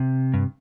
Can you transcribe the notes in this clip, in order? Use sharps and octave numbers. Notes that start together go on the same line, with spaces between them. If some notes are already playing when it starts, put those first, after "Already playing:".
Already playing: C3
G2